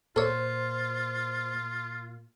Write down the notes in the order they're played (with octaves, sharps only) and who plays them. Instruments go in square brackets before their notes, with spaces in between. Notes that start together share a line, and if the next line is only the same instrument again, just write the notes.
[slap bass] A#2 [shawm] F4 [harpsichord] A4 C#5 [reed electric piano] C5